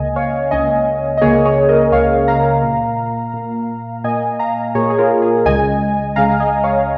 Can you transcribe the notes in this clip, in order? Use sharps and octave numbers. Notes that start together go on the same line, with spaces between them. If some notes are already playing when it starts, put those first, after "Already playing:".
Already playing: C#2 C#3 A#3 D#5 G#5
C#5 F5
C#2 C#3 A#3 D#5 G#5
D#5
C#2 C#3 A#3 G#4 C#5
G#4 C#5
A#4 D#5
C#2 C#3 A#3 C#5 F5
F5 A#5
A#2 A#3
A#2 A#3
A#2 A#3 D#5 G#5
F5 A#5
A#2 A#3 G#4 C#5
G#4
F4 A#4
G#4
C#2 C#3 G#3 D#5 G#5
C#2 C#3 G#3 F5 A#5
F5
D#5 G#5
C#5 F5